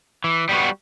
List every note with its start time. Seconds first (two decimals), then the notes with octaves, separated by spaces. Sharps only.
0.24 E3
0.49 G3 B3 F#4